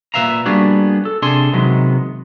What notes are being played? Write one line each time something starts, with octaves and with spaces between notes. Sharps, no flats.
A#2 F#3 B4 E5 F5 A#5
G3 A#3 B3 D4 F#4 G#4
A4
C3 D4 G#4 A4 C6
C3 D#3 F#3 G#3 B3